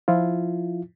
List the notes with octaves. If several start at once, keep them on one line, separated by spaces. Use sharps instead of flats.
F3 E4 F4